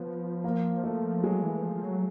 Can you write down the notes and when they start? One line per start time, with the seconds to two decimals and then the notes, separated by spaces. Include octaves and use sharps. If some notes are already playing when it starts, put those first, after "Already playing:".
Already playing: F3 B3
0.44 A#3
0.83 A3
1.23 F#3 G#3
1.43 E3
1.62 F3
1.75 F3
1.83 F#3